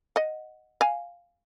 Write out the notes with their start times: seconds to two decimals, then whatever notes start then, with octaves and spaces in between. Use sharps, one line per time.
0.16 D#5 F#5
0.81 F5 G#5